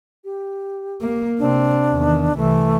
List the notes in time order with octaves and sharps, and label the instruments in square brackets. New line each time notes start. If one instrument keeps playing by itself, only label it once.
[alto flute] G4
[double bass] A#3
[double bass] C3 C4 [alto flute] D4
[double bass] E2 D#3
[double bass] C2 E3 [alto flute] A3